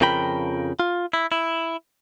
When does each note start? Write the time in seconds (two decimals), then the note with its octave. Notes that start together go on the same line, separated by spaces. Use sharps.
0.01 F2 C#3 F3 A#4 G5 B5
0.80 F4
1.13 E4
1.32 E4